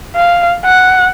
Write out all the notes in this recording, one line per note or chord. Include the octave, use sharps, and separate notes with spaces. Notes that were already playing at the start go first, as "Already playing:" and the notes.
F5
F#5